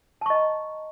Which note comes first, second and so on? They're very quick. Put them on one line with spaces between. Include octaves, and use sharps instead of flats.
A5 C#6 D#5 A#5